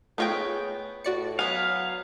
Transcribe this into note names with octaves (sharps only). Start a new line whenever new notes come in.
A3 B3 F4 G#4 C#5 D#5 G5
A2 F#4 D5 C#7
F#3 B3 F5 G#5